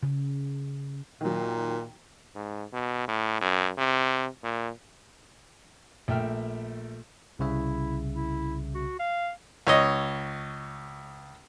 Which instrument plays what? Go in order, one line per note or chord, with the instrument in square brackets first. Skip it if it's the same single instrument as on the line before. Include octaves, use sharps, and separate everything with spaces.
[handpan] C#3
[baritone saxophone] A#2 [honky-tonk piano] D#3 F#3
[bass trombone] G#2
B2
A2
F#2
C3
A#2
[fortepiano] A#1 A3 E5 G5 F6
[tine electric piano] C2 C#3 E5 [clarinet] E4
[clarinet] E4
F#4
F5
[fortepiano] C#2 C#5 D#5